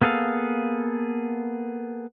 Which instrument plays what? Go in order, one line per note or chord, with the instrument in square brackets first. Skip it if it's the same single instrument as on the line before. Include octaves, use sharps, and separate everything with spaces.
[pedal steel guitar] A#3 B3 G#4 A4 F5